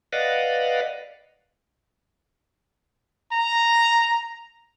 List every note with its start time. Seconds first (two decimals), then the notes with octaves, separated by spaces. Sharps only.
0.13 B4 D5 D#5 F5 F#5
3.32 A#5